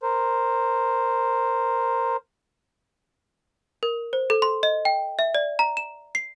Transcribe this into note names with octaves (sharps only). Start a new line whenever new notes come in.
A#4 C5
A#4
C5
A4
C6
D#5
G5
E5
D5
A#5
E7
C7